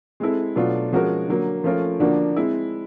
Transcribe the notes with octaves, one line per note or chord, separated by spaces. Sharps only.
G#3 C4 E4 A4
B2 F#3 A3 D4 F4
F3 G#3 C#4 F#4 A#4
D3 F#3 A#3
F3 A3 C#4 F4 A#4
D3 F3 A#3 D4 F#4
G#3 C4 E4